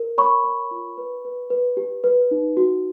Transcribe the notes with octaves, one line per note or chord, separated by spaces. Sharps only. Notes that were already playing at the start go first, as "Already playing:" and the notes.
Already playing: A#4
C#5 B5 C#6
C#5
F4
B4
B4
B4
G4
B4
D#4
F#4